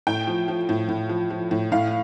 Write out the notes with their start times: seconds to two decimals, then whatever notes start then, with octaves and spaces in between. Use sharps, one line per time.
0.07 A2 G5
0.27 F3
0.48 F3
0.69 A2
0.89 A2
1.09 F3
1.31 F3
1.51 A2
1.72 A2 F5